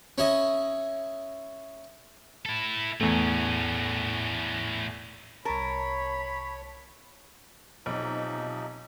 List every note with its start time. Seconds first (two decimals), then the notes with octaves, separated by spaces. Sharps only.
0.18 C#4 E4 D#5
2.46 E4 A4
3.01 E2 A2 A3 C#4
5.45 C2 A#4 C#5 A5 B5
7.86 B1 C3 F3 D#4